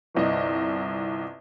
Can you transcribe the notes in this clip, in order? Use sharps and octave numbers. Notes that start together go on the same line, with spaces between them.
G1 C2 D#5